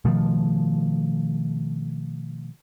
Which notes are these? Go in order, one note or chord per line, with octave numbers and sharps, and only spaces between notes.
B2 D#3 F3 A3